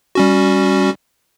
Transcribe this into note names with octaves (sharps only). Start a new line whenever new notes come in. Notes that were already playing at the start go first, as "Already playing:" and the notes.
G3 C#4 F#4